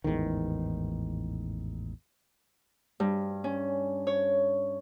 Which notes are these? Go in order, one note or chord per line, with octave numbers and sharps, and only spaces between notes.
A1 E2 G#2 D#3
G2
C#4
C#5